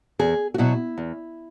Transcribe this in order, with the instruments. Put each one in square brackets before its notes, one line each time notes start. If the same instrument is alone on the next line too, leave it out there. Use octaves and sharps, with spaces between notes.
[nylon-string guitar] E2 G#4
F#4
B2 F#3 E4
E2